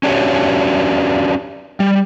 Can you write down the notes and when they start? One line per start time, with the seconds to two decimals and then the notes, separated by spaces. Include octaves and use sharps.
0.03 C#4 D4 F#4 G4 C#5
1.80 G3